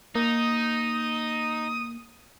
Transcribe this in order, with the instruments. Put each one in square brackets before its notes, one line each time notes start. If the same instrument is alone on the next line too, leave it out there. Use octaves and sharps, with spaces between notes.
[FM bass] A#3 [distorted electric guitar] D#4 [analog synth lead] D#6